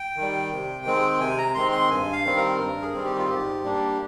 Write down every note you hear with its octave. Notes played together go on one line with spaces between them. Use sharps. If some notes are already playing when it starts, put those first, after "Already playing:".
Already playing: G5
D#3 G3
C3
D#3 G#3 C4
C3 G#5
A#5
D#3 G#3 C4 C6
C6
G2 G#5
F5
D#3 G3 C4
A#4
G2 A#4
G#4
D#3 G3 C4
G4
F4
G#2 G4
G3 A#3 D4